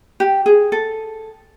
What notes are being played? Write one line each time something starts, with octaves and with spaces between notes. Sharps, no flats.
G4
G#4
A4